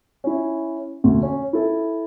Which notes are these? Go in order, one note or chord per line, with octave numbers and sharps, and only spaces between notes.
C#4 E4
D2
C#4
E4 A4